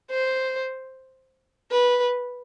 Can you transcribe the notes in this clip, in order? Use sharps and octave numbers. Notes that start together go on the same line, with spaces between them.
C5
B4